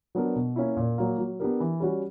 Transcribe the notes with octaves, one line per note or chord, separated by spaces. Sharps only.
F#3 B3 D4 A#4
B2
A#3 C#4 E4
A#2
F#3 A#3
F#3
B3 D4 G4 A#4
E3
G3 C#4 F#4